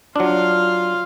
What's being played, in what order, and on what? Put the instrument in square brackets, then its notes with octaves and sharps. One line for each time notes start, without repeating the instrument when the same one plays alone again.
[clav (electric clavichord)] F#3 D4 [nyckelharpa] F4 F5